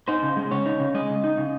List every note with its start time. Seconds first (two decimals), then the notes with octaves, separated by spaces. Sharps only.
0.08 D#4 C5
0.23 C#3
0.37 G#3
0.51 C#3 C#5
0.66 D#4
0.80 C#3
0.94 G#3 D#5
1.09 C#3
1.24 D#4
1.38 C#3